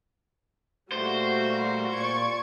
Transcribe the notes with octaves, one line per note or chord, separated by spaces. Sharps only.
A#2 G3 A3 F#4 A#4 C5
A#2 D5 C#6 G#6